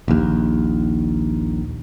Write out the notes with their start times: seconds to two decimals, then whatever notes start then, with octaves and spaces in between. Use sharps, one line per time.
0.08 A#1 D#2